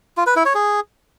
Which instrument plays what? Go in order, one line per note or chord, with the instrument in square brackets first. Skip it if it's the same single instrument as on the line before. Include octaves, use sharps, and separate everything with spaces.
[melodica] F4
B4
E4
C#5
G#4